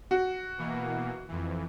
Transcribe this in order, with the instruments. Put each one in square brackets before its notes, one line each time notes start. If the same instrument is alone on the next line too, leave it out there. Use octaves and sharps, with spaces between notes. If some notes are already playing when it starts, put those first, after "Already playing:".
[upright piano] F#4
[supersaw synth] B2 E3 A#3
F2 E3